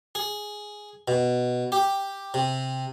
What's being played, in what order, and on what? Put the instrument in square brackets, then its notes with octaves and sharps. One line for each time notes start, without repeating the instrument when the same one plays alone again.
[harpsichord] G#4
B2
G4
C3